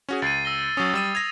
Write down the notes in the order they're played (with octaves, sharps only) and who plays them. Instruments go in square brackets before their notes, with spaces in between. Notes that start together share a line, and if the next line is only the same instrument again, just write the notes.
[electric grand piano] C#4 F#4 G#4
[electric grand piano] C#2 [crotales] A6 C7 D#7
[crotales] E6 A#6 G7
[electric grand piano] F#3 C#4 [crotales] D#6 E6
[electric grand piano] G3 E6 D#7 [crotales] A6
[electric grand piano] G#6 A#6 [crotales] F7